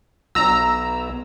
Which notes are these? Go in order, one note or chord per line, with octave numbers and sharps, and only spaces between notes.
B1 A#5 E6